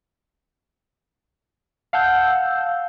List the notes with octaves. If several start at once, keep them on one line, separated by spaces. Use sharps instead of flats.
F5 F#5 A5 E6 G6